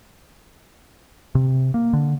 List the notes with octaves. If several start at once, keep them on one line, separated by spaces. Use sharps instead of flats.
C3
A#3
D3